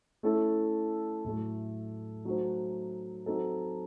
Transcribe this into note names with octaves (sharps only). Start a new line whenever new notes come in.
A3 C#4 E4 A4
A2 F#3 A3
F#3 A3 D#4 F#4 C5
F#3 C4 D#4 A4